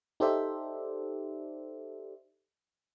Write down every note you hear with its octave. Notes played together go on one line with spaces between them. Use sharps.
D#4 G4 A4 C5 D5 E5